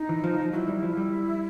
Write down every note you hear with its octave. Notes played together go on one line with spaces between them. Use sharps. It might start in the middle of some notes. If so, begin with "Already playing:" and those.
Already playing: D#4
E3
F3
F3
F#3 E4
G3
F3
G3